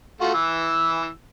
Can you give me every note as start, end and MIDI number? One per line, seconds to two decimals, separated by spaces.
0.21 0.32 57
0.21 0.32 65
0.21 0.32 66
0.34 1.09 52
0.34 1.09 88